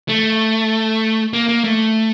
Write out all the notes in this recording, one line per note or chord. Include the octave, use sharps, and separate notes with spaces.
A3
A#3
A#3
A3